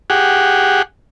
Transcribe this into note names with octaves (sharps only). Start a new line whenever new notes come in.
G4 G#4 F#5